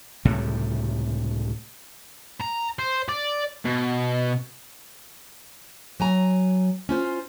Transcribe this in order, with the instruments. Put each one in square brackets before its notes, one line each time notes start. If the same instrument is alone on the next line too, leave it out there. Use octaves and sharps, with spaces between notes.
[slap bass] C#2 A2 C3 G3
[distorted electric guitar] A#5
C5
D5
B2
[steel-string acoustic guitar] F#3 G#5 A#5
C#4 F4 C5